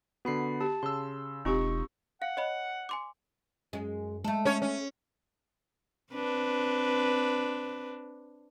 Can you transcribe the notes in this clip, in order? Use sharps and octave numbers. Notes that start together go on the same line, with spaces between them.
D3 B3 F#4 B5 C7
G4 A5
C#3 C6 E6
E1 C4 D#4 F4 G4 C#6
F5 F#5
C#5 D#5 B5
G#5 C6 D6
F#2 G#3
G#3 A3 A4
C#4 C#5
C#4
C4 D4 B4